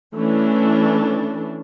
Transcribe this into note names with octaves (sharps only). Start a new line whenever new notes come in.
E3 A3 C#4 D4